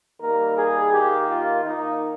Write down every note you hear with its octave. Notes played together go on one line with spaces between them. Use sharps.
D#3 G3 A#3 A#4
G#4
D#3 A#3 G4
F4
D#3 A#3 D#4